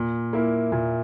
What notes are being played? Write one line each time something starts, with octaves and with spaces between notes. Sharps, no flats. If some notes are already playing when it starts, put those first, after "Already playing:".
Already playing: A#2
A#3 E4
A#2